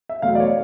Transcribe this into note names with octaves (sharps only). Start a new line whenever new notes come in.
E5
E2 B2 F#3 A3 F5
D5
C#5